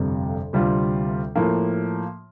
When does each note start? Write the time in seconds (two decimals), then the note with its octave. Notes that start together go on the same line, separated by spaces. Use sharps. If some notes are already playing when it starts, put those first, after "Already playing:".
Already playing: G1 F2 C3 G3
0.53 D2 C3 G3 C4 F4
1.36 A2 F3 A#3